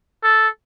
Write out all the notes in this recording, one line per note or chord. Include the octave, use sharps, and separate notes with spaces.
A4